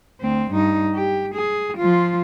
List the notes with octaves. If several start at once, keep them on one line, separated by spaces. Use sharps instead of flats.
D2 C4
G2 D#4
G4
G#4
F3 F4